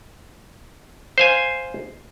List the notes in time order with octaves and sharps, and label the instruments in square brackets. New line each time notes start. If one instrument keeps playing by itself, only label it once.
[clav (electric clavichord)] C5 F5 G#5